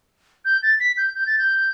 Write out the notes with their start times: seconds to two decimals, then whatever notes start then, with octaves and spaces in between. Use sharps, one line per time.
0.45 G6
0.63 A6
0.80 B6
0.98 G6
1.15 G6
1.27 A6
1.39 G6